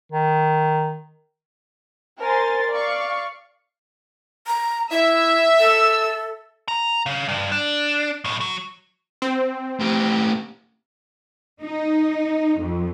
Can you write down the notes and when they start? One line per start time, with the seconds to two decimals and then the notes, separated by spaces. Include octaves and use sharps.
0.12 D#3
2.20 A#4 C5 G#5 C6 A6
2.71 D5 F5 C#6
4.47 A#5
4.91 E4 E5
5.59 A4 E6
6.68 A#5
7.06 C#3
7.29 G2
7.52 D4
8.24 B1 A2
8.41 F#3
9.22 C4
9.80 A2 G4
11.61 D#4
12.58 F2